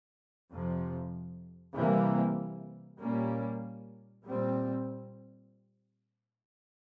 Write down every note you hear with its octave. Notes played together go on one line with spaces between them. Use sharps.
F2 C3 F3
C3 E3 G3 A#3
A#2 G3 A#3 C#4
A#2 G3 C4